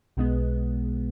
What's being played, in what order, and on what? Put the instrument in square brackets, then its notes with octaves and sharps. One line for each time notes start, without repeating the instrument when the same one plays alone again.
[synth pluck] B1 B2 G#3 B3